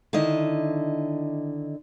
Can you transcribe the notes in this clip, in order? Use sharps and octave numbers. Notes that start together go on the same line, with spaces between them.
D3 D#3 E4 D#5